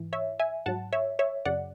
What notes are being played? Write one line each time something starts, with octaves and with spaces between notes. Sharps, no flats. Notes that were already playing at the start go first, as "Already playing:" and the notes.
Already playing: G#2 E3
C#5 E5
E5 G#5
G#2 F#3 F#5 A5
C#5 E5
C#5 E5
F#2 C#3 F#3 D5 F#5